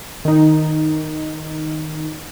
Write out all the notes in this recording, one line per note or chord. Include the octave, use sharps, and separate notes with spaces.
D#3 D#4